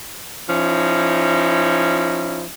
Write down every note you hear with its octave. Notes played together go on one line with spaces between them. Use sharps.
F3 C#4 D#4 E4